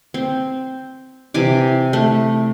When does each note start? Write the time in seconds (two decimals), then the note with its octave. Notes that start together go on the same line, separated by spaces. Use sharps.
0.14 C4
1.34 C3 E3 G#5 D6
1.93 A3